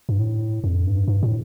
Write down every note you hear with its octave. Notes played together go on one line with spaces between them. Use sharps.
G2
A2
F2
G2
G2
A2